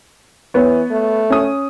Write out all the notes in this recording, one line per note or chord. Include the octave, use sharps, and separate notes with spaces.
E3 B3 C#5
A3
C#4 D#6